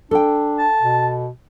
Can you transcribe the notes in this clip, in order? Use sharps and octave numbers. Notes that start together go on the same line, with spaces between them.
D4 A4 G5
A5
B2